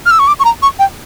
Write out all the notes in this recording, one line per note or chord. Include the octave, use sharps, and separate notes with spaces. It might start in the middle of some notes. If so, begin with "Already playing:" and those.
F6
E6
C#6
D6
C#6
A#5
C#6
G5